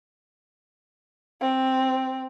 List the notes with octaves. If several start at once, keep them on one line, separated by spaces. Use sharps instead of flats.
C4